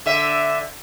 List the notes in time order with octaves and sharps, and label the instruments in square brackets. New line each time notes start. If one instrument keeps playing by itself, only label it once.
[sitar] D3 E5